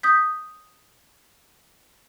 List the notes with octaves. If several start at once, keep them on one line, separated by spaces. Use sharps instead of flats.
D#6 G6 B6